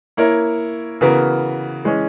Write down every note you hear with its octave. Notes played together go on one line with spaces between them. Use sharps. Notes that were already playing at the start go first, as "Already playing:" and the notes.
A#3 E4 A#4 C#5
C#3 E3 B3 F#4 A#4
E3 G#3 C#4